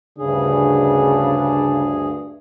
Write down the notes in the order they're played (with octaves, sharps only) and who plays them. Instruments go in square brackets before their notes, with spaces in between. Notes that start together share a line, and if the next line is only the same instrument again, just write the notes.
[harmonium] D2 G2 G#4 [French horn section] C#3 [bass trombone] D4